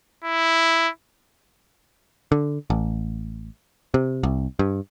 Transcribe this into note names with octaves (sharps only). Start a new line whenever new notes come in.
E4
D3
A1
C3
C2
G2